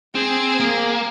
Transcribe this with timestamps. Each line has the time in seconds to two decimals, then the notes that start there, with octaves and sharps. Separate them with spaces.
0.15 C4 G#4
0.60 A#3